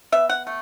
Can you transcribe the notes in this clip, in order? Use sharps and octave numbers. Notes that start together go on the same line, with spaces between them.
B3 E5
F#5
A3